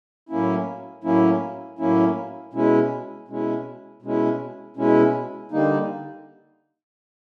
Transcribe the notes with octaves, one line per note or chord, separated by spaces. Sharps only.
A2 F#3 A#3 C#4 E4
A2 F#3 A#3 C#4 E4
A2 F#3 A#3 C#4 E4
B2 G#3 C#4 E4
B2 G#3 C#4 E4
B2 G#3 C#4 E4
B2 G#3 C#4 E4
D3 G3 A#3 D#4